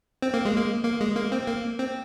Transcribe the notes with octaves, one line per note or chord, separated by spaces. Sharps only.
C4
A#3
G#3
A#3
A#3
G#3
A#3
C4
A#3
C4